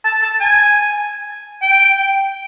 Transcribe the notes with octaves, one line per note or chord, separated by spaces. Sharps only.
A5
A5
G#5
G5